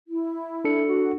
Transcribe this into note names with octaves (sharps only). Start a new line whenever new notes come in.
E4
D4 A4 C#7
F#4